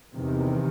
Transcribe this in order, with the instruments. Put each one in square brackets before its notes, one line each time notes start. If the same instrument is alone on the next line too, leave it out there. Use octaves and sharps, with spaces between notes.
[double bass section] E2 C3 D#3